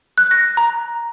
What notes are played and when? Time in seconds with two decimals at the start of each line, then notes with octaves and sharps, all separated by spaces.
0.18 F#6
0.31 A#6
0.57 A#5